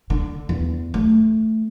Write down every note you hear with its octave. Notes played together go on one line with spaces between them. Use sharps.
D3
E2
A3